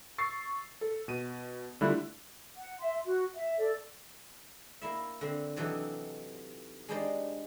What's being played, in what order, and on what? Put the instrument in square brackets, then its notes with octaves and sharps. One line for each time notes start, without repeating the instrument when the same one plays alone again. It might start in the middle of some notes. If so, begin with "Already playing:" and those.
[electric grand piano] C#6 E6 A6 C7
A4
B2 D#7
D3 G3 A3 E4 F4 F#6
[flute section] F#5
E5 C6
F#4
E5
A4 D5
[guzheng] A#3 E4 E5
D3 C4
C3 E3 F#3 D#4 G4 A4
G#3 D4 D#4 G4 C5 D5